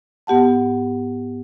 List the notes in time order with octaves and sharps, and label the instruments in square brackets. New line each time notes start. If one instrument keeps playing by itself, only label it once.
[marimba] G#2 B3 G4 F#5 A5